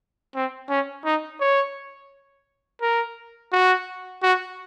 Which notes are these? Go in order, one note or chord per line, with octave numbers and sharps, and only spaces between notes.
C4
C#4
D#4
C#5
A#4
F#4
F#4